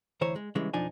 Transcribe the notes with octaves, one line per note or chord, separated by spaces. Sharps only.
D2 E3 C5 C#5 A#5
G#3
C#3 E3 G3 G#3
B1 F2 F3 D4 D#4 G#5